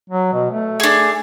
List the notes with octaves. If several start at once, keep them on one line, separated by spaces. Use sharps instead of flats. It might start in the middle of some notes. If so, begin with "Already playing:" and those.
F#3
B2
A3
D4 G#4